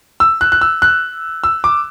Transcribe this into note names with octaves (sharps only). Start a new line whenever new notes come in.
E6
F#6
F#6
E6
F#6
E6
D6